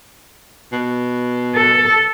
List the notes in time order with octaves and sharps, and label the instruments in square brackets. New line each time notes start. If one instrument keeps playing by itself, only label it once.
[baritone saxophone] B2
[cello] A4